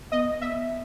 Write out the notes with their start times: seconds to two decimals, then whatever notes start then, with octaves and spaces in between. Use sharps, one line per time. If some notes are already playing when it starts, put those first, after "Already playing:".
0.12 B3 D#5
0.41 E5